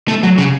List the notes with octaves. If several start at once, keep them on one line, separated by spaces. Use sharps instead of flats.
A3
F#3
C#3